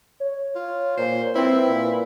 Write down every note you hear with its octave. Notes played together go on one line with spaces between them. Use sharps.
C#5
F4
A#2 C5
C4 E4 B4
A#2